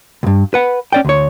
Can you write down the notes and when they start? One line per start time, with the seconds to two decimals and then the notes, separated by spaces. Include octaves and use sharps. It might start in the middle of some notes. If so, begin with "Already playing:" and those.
0.23 C#2 G2
0.54 B4 F#5
0.93 C#4 D5 G5
1.05 D2 C#5